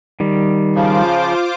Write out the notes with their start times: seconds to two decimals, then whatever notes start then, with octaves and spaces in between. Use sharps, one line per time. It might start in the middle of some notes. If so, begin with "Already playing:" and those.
0.20 D#3 G3
0.75 C#3 F3 F4 C5 D6